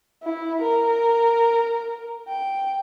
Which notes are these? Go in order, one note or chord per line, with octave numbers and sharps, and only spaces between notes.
E4
A#4
G5